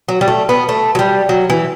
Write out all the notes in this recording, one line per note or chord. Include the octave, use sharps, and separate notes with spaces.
F#3
G3
A3
B3
A3
F#3
G3
F#3
E3